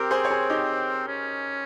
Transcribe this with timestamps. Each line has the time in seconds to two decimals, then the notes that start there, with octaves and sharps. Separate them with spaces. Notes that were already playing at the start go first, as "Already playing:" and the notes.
Already playing: C4 G4 A#4
0.11 G#4 C5
0.25 C#5
0.31 G#4 C5
0.50 D#4 G4
1.08 C#4